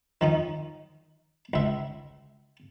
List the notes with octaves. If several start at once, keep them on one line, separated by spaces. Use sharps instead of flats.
D#3 F3 D#4
C#2 E5